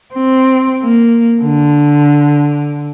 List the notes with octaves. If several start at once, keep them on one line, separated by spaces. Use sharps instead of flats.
C4
A#3
D3